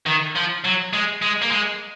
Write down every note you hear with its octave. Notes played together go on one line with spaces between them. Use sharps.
D#3
F3
F#3
G#3
G#3
A#3
G#3